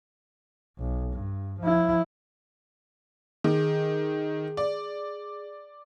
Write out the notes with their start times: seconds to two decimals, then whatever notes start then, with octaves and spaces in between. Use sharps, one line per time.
0.78 B1
1.13 G2
1.60 F3 E4
3.44 D#3 G#4
4.57 D5